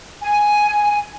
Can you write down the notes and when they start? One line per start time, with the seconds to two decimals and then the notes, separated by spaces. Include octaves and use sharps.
0.22 G#5